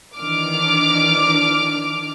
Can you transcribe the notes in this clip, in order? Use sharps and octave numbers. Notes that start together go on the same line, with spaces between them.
D#3 E3 D4 D6 F6